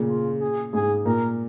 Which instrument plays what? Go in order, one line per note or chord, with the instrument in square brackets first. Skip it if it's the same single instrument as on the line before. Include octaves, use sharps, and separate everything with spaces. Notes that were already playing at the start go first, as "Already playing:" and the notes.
Already playing: [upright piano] A#2 C#3
[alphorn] F4
G#4
[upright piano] G#2 [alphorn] G#4
[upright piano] A#2 [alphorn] A#4